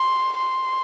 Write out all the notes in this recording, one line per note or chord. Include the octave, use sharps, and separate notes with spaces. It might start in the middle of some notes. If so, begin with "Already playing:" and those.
Already playing: C6
C6